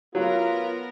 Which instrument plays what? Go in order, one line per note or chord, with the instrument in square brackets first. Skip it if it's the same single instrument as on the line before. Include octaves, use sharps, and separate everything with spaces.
[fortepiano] F#3 [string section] B3 A#4 [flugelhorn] F4